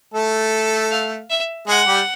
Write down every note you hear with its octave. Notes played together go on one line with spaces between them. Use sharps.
A3 A4
F5
E5
G#3 G#4 F#5
G3 G4